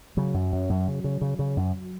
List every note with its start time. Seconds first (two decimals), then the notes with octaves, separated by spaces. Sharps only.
0.17 C#3 F#3
0.34 F#2
0.53 F#2
0.70 F#2
0.88 C#3
1.04 C#3
1.21 C#3
1.39 C#3
1.57 F#2